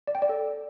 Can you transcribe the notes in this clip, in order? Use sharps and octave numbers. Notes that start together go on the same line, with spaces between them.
D5
G5
D5
A4